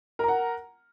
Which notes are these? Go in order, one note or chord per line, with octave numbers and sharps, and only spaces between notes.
A#4 F#5 A#5